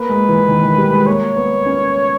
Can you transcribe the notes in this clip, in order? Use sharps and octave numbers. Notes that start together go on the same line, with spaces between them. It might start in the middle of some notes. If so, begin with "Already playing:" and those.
Already playing: A#3 B4
G#3
E3
D#3
E3
G3
G#3
A#3 C#5
B3
C#4